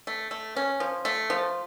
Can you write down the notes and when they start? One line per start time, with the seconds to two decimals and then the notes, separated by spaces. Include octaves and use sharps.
0.07 A3
0.31 A3
0.56 C#4
0.80 F3
1.05 A3
1.30 F3